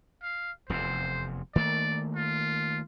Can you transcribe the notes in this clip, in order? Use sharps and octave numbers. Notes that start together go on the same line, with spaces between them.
F5
F1 E2 C3 C5
D#3 A3 A#3 D5
F4